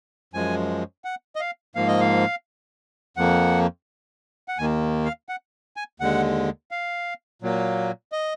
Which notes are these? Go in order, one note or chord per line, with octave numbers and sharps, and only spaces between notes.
F#2 F3 G#3 G#5
F#5
D#5
F5
G#2 F3 A#3 F5
D#5
F5
F2 F3 A#3 F#5
F#5
D#2 D#3 A#3 G#5
F5
F#5
G#5
D#2 D3 G#3 F#5
F5
A#2 F#3 A#3
D#5